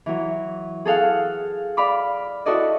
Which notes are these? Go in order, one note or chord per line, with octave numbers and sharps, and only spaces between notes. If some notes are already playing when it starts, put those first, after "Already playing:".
E3 F#3
G#4 A4 F5 F#5
D5 F5 B5 D6
E4 F#4 A4 D5 D#5